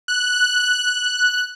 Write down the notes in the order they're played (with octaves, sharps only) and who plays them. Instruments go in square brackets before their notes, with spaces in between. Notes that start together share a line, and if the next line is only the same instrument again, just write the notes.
[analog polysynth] F#6